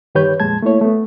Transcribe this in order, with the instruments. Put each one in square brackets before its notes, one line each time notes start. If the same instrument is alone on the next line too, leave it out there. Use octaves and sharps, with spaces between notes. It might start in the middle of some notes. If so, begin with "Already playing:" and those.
[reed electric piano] G2 D#3 G4 B4 C#5 G6
F2 A#2 G#3 A5 G#6
A3 A#3 E4 C#5
A3 B3